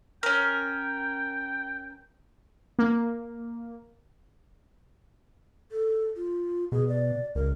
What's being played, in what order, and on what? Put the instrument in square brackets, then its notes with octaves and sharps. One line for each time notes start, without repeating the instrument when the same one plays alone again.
[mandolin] C#4 A#4 [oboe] G5
[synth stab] A#3
[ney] A4
F4
[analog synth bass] B2 [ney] G#4
[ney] D5
[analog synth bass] C#2 [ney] A#4